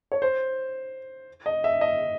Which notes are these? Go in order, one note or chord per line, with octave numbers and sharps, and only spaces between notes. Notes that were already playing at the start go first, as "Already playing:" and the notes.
C#5
C5
D#5
E5
D#5